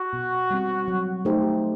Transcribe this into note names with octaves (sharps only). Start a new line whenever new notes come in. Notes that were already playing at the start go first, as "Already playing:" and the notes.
Already playing: F#4
B2
G3 C4
F#3
A3 D#4 G4 C5